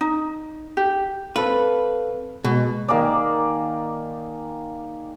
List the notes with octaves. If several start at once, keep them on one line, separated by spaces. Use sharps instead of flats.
D#4
G4
C4 A4 B4 F5
B2 G#3
D#3 A#3 G#4 D5